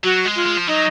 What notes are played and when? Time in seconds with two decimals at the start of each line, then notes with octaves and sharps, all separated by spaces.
0.03 F#3 F#4
0.25 G#3
0.35 F4
0.45 G#3
0.57 F3
0.67 F#3 D#4